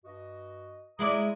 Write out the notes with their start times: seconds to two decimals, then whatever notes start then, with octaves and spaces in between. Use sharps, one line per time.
0.05 G2 F#4 D#5
0.99 G#3 E4 D5 A#5 D#6